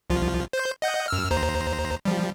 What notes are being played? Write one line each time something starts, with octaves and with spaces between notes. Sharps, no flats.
C2 F3 F4
C5 G6
D#5 F#5 G6
F#2 E6 F6
D#2 C5 A#5
F3 G3